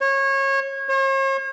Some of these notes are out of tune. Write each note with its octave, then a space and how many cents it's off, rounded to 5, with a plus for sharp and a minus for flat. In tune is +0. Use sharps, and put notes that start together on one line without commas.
C#5 -25
C#5 -45